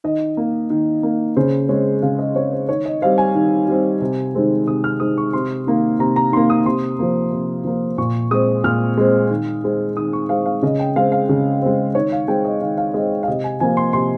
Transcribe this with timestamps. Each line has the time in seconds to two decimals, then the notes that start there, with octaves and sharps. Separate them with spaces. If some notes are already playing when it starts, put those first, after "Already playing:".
0.04 D#3 D#5
0.37 A#3
0.70 D#3
1.03 A#3
1.36 C#3 C5
1.69 G#3 C4 C#5
2.02 C#3 F5
2.19 D#5
2.35 G#3 C4 C#5
2.52 C5
2.69 D#3 C#5
2.85 D#5
3.02 G3 C4 F5
3.18 G#5
3.35 D#3
3.68 G3 C4
4.01 C3
4.35 D#3 G#3 C4
4.67 C3 D#6
4.84 F6
5.00 D#3 G#3 C4 D#6
5.17 C#6
5.33 C3 C6
5.67 D#3 A#3
5.99 C3 A#5
6.16 A#5
6.32 D#3 A#3 C6
6.50 D#6
6.66 C3 C6
6.99 F3 A#3
7.32 C3
7.65 F3 A#3
7.98 A#2 C#6
8.31 G#3 C4 D#6
8.64 A#2 F6
8.98 G#3 C4
9.30 D#3
9.64 G#3 C4
9.96 D#3 D#6
10.13 C#6
10.29 G#3 C4 F5
10.46 F5
10.62 C#3 D#5
10.79 G5
10.96 G#3 C4 F5
11.12 F5
11.29 C#3
11.62 G#3 C4
11.95 D#3 C#5
12.12 F5
12.28 G#3 C4 G5
12.45 D#5
12.61 D#3 F5
12.77 F5
12.94 G#3 C4 D#5
13.23 F5
13.28 C3 D#5
13.44 G#5
13.60 F3 A#3 G#5
13.77 C6
13.93 C3 C6